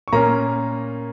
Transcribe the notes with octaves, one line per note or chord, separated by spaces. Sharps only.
C#6
A#2 A#3 C#4 A#5